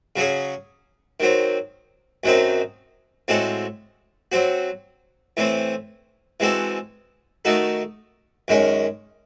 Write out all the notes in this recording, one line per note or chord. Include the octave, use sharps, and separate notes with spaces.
C#3 F#3 C#4 G#4
D#3 F#3 C4
F#2 D#3 F#3 C4 D#4
A2 G#3 C4 F#4 A4
F#3 C4 F#4
A2 E3 C4
E3 G#3 C4 F#4 A4
D#3 A3 D#4 F#4 A4
F#2 D#3 G#3 C#4